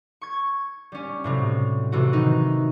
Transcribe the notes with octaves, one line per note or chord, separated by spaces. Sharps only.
C#6 G#6
G3 C#4
A2 C3 F#3
C3 E3 A3 F#4
D#3 D#4